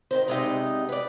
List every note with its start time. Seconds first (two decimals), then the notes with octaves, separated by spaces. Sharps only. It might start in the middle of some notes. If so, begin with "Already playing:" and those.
0.11 D#3 A#4 C5
0.28 G2 C3 G#3 B3 D#4 D#5
0.89 B4 D5